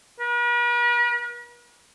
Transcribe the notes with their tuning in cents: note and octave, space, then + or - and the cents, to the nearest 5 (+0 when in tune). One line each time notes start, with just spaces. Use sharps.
B4 -45